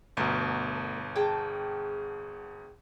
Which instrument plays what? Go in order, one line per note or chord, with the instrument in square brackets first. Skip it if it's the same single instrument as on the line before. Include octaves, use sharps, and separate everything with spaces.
[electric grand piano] G1 B2 [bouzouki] A3 A#4 E5
[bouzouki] G#4 G5 A5